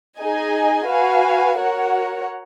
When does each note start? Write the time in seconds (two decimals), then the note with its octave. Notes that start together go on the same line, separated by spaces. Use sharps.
0.18 D#4 G#4 D#5 G#5
0.87 F#4 B4 F5 G#5
1.56 F#4 A#4 C#5 F#5